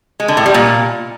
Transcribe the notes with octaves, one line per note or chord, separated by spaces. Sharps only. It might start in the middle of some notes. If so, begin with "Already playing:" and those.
G#3
D3
A2
G3
A#2